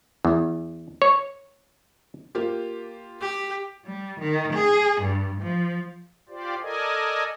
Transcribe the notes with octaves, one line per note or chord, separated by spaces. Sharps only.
E2
C#5
A#3 F4 G4
G4
G3
D#3
G#4
G2
F3
F4 G4 C5 D5
A4 A#4 D5 D#5 G#5